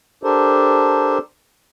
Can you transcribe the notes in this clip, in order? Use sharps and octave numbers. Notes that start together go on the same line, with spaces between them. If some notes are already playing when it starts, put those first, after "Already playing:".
D4 G4 A4 A#4 C5